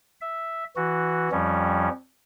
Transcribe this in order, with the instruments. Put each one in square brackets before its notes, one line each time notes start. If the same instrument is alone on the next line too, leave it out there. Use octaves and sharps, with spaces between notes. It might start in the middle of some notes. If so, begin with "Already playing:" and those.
[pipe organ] E5
E3 F#4
F2 F3 G3 C#4